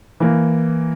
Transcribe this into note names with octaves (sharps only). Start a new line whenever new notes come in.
E3 A#3